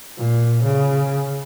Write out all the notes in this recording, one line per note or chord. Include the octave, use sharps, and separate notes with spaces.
A#2
C#3